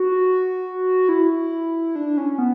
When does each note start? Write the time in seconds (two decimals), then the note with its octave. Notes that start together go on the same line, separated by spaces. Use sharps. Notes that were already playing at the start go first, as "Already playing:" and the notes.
Already playing: F#4
1.09 E4
1.96 D4
2.18 C#4
2.38 B3